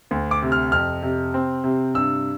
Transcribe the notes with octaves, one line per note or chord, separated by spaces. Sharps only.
D2
D6
C3
F6
F2 F6
C3
C4
C3
G2 E6